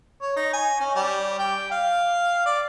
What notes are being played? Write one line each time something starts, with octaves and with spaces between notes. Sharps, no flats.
C#5
D#4
G#5
C#4
G3
G5
F5
D5